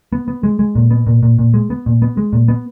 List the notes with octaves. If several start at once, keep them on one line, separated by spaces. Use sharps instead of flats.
B3
B3
G#3
G#3
A#2
B3
A#2
A#2
A#2
G#3
B3
A#2
B3
G#3
A#2
B3